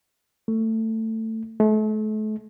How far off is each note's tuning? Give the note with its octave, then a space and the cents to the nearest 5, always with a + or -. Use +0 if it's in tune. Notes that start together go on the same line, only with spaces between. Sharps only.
A3 +20
A3 -35